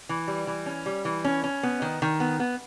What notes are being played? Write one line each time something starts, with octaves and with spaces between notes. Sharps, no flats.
E3
G3
E3
C#4
G3
E3
C#4
C#4
B3
D#3
D#3
B3
B3